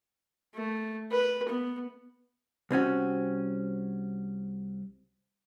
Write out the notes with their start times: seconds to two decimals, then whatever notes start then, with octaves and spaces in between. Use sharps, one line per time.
0.55 A3
1.11 B4
1.48 B3
2.71 C2 C4 C#4 F#4